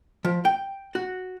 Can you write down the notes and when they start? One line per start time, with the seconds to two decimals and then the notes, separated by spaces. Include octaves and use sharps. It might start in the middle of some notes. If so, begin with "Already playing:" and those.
0.25 F3
0.45 G5
0.95 F#4